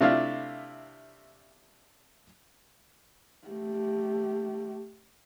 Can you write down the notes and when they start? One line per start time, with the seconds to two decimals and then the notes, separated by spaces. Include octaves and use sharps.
0.01 C3 A3 D4 E4 F4 F5
3.48 A3 G4